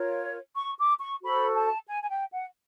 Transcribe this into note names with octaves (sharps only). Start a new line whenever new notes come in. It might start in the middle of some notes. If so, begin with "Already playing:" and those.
Already playing: F4 A#4 C#5
C#6
D6
C#6
F#4 A4 C5 B5
A5
G#5
G#5
G5
F#5